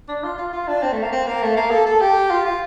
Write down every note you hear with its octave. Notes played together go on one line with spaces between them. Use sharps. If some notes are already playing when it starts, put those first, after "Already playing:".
D4
F4
F4
F4
D4
C4
A3
A#3
C4
A#3
A3
A#3
A4
A4
G4
F4
F4